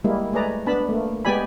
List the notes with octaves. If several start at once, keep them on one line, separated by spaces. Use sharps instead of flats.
G3 G#3 A#3 E4
G#3 A3 G#4 B4 D5 A#5
B3 D4 A5 B5
A3 A#3
G#3 B3 G4 D5 G#5 B5